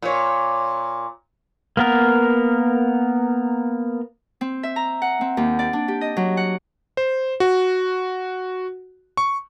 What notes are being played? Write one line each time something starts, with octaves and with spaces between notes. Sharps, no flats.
A#2 C#5
A#3 B3 A#4
C4
E5
A#5
F#5
C4
D#2
D5
D4
G4
D#5
F#3
F#5
C5
F#4
C#6